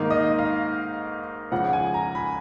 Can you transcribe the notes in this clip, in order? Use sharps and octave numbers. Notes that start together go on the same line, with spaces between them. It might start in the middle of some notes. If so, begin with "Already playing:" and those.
Already playing: G#2 D#3 A#3 D#4 F5
D#5
F5
C#2 C#3 F3 F#5
G#5
A#5
B5